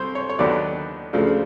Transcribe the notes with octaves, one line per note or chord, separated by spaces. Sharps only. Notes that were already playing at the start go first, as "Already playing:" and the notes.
Already playing: C2 C4 C5
C#5
C#5
D#2 D#3 F#3 B3 D4 D5
D2 C#3 F3 A3 D4